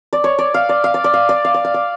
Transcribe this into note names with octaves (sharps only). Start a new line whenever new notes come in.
D5
C#5
D5
F5
D5
F5
D5
D5
F5
D5
F5
D5
F5
D5